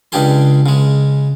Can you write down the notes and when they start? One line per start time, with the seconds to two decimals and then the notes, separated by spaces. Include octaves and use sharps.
0.12 C#2 C#3 D4 G4 G#4 C6
0.66 C#3 G#3